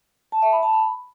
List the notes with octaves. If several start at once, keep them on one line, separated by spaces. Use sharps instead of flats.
A5
E5
B5
A5
B5